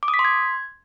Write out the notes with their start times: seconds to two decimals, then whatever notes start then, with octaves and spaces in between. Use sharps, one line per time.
0.03 D6
0.08 D#6
0.14 B6
0.19 C6
0.25 G#6